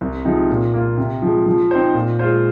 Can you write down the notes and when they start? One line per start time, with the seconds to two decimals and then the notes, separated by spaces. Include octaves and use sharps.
0.01 C2
0.25 C3 F3 G#3 D#4
0.49 A#2
0.74 A#3 F4
0.97 C3
1.22 F3 G#3
1.46 F3
1.71 C4 D#4 C5
1.94 A#2
2.19 G#3 F4 C5